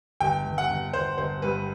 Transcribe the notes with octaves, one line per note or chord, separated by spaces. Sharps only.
G1 G5
G1
F#5
G1
G1 C5
G1 C5
G2 B4